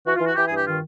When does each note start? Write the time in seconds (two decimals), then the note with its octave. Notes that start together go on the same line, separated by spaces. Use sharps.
0.06 E3 F#4
0.16 F4
0.20 E3 F#4
0.36 E3 G4
0.46 G#4
0.51 G2
0.56 G4
0.66 D#3 F4